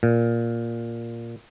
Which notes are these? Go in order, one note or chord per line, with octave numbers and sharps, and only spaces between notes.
A#2